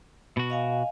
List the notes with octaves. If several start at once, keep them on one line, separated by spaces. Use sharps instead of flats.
B2 F#4
D#5 F5 G#5